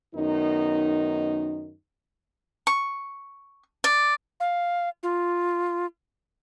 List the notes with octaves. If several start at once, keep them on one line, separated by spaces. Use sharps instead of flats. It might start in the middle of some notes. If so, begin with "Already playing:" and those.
F#2 D#3 B3 D#4
C#6
D5
F5
F4